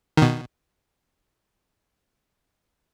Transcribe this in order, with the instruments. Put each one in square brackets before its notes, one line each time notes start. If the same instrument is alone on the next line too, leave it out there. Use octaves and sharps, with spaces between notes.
[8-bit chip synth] B2 D#3